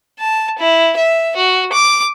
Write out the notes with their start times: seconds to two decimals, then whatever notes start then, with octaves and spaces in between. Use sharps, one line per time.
0.19 A5
0.58 E4
0.97 E5
1.36 F#4
1.72 D6